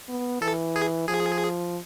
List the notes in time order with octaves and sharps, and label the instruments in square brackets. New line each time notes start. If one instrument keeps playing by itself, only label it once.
[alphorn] B3
[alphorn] E3 [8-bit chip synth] A4
[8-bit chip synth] G#4
[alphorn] F3 [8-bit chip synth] G#4